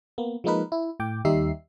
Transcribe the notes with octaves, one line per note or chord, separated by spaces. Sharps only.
A#3 B3
F3 G#3 A#3 D#4 A#4 B4
E4
A2 G5 D6
D#2 G3 D#4 G4 E5 C7